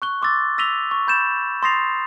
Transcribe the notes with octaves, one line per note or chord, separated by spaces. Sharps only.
C#6 F#6 G7
C6 D6 E6 A6
E6 A#6 B6 D#7 F7 G7
C#6
B5 G6 A6 E7
C6 D#6 A6 A#6 C7 F7